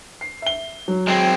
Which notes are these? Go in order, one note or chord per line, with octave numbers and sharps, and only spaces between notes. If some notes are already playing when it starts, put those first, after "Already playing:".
C7
E5 G7
F#3
G#3 C4